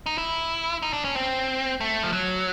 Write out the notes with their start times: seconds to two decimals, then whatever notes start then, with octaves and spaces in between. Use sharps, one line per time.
0.06 D#4
0.18 E4
0.82 D#4
0.93 D4
1.05 C#4
1.15 C4
1.81 A3
2.03 F3
2.13 F#3